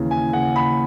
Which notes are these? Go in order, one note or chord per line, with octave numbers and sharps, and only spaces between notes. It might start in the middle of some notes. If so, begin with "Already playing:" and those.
Already playing: D#2 C#3 E3
G#5
C#3 F#5
B5